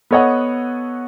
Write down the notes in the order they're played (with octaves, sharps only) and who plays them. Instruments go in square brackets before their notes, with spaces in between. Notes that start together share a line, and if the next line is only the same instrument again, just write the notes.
[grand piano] B3 A4 C#5 D#5 F#5